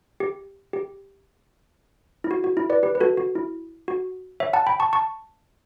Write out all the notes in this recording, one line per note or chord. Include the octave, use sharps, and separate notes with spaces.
G4
G4
E4
F#4
F#4
E4
B4 D5
G4 B4
B4
F#4 A4
F#4
E4
F#4
C#5 E5
F#5 A5
G5 B5
A5 C#6
A5 C#6